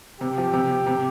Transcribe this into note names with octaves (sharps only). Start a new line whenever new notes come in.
C3 G4
F3
C3
C3
C3